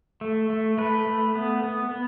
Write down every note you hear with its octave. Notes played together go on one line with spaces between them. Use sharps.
A3
A3
A3 B4
A3
B3
B3
B3